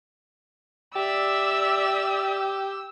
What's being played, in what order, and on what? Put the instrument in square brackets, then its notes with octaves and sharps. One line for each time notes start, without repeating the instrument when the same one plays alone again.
[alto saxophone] G4 [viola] D5 E5 [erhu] E6